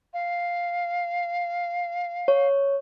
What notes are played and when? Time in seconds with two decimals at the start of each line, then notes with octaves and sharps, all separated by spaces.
0.13 F5
2.28 C#5